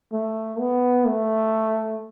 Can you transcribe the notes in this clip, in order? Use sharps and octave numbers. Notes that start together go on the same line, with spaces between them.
A3
B3
A3